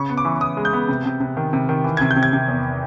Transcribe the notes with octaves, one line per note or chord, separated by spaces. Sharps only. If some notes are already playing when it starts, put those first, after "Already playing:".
Already playing: C#3 C#6
B3
D6
E3
E3 D#6
G#3
G6
B3
C3
C3
C3
D#3
C3
D#3
E3
C3 G#6
G6
C3
G#6
C3
E2